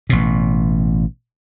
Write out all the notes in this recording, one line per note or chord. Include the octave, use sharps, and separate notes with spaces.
A1 B2